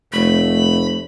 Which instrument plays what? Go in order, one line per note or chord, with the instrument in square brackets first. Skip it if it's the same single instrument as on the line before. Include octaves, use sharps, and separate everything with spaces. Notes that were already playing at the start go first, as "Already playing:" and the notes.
[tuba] F1 [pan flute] A3 [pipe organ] B5